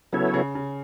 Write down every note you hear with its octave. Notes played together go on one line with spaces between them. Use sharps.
C#3 F#3 B3 E4 A4 C#5
C#3
C#3